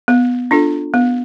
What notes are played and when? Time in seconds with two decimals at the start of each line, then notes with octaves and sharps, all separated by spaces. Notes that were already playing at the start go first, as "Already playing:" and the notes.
0.08 B3
0.51 D4 F4 A4
0.94 B3